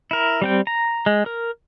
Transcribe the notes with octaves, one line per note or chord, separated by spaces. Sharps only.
E4 A#4
G3 C4 G5
A#5
G#3
A#4